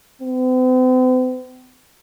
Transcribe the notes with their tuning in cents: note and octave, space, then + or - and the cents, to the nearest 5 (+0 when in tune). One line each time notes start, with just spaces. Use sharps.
C4 -45